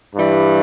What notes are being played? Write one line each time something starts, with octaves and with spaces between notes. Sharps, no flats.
G2 E3 G3